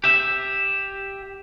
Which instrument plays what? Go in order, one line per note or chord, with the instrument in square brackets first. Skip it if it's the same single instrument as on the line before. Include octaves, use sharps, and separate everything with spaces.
[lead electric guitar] G4 E5